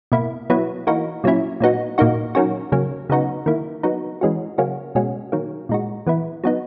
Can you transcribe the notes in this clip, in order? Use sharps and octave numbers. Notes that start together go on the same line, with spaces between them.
B2 A#3 E4
F#3 B3 E4
E3 A#3 D#4 F#4
A#2 F#3 C#4 E4
A#2 F#3 B3 D#4 F#4
A#2 A#3 D#4 F#4
D#3 F#3 A#3 C#4 F#4
C#3 F#3 A#3 C#4
C#3 F#3 B3 D#4 F#4
D#3 A#3 E4
F#3 B3 D#4 F#4
E3 G#3 C#4 F#4
C#3 F#3 A#3 C#4 F#4
B2 G#3 C#4 F#4
D#3 F#3 A#3
A#2 G#3 D#4 F#4
E3 B3 E4
F#3 B3 D#4